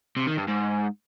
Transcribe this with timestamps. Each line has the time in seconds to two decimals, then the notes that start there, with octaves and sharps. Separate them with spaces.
0.17 C3
0.27 D#3
0.37 G2
0.48 G#2